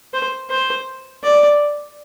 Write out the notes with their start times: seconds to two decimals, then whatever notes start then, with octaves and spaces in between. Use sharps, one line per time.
0.14 C5
0.50 C5
1.23 D5